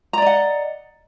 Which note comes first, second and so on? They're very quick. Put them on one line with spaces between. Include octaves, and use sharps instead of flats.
A#5 D5 D#5 F#5